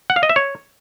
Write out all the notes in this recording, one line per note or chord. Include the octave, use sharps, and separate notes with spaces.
F#5
F5
D#5
E5
C#5